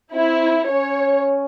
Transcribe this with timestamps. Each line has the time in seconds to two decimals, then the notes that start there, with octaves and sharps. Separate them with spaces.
0.14 C4 E4
0.68 C#4 C#5